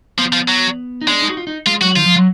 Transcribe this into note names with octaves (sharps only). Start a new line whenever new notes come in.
F3 B3
F3
F#3
D#4
G#3 D4
D#4
F#4
F4
D#4
G#3 F4
F#3 F#4
D#3 F4
F3
F#3